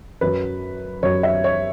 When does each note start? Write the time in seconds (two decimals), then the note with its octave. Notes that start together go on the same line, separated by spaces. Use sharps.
0.21 F#2 F#3 B4
1.03 F#2 F#3 C#5
1.23 E5
1.44 C#5